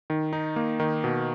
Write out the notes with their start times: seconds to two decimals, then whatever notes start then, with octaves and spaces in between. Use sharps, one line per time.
0.10 D#3
0.33 D#4
0.56 A#3
0.80 D#3
1.04 B2